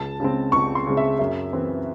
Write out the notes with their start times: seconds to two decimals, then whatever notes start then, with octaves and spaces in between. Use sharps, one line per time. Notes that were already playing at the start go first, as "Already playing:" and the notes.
Already playing: C#2 A5
0.20 C#3 G#3 C4
0.52 C#2 C#6
0.75 C6
0.86 C#3 G#3 C4
0.97 E5
1.19 F#2 E5
1.53 E3 C4